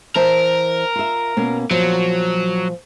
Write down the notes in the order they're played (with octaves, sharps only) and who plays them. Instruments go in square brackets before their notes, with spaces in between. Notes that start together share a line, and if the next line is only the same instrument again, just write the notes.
[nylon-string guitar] E3 C5 A5 [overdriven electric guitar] A#4
[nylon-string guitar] F4 E5
B2 A#3 C#4
[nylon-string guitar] A#2 F3 [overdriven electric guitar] F#3